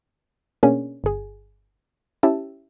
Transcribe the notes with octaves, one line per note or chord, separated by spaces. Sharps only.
B2 A#3 C#4 D4 G#4
G1 G#4
C#4 E4 G4 E5 A5